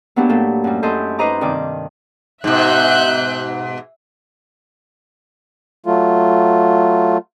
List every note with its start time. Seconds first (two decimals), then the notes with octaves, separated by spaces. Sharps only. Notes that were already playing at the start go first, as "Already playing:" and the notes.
0.16 F#3 A#3 B3 D4 E4 G4
0.29 A2 A3 A#3 A4
0.64 F#2 G3
0.83 F#2 E4 A4 D#5 C6 G6
1.19 D#4 B4 C5 D#5 A#5 D6
1.41 G2 C3 D#3 G3 D6
2.44 G#2 B2 E5 F#6 G6
5.86 F#3 A3 F4